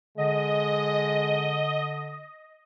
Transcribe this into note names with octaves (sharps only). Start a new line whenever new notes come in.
D3 G#3 D#5